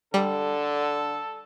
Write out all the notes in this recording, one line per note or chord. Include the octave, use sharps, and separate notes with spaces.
D3 G3 A4